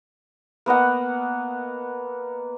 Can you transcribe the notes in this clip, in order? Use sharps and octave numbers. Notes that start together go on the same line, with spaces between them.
A#3 B3 D#5 F#5